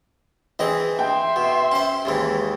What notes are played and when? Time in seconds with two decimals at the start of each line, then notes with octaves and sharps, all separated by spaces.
0.59 E3 C4 G#4 D#5
0.99 E5 G5 C6
1.36 B2
1.72 C#4 C5
2.05 D#2 G#2 E3